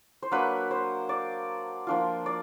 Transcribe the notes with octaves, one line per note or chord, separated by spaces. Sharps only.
C5
F#3 A#3 D4 B4
C5
D5
F3 A#3 D4 F4
D5